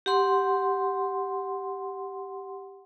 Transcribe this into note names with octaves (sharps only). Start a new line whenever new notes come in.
G4 F#5 C6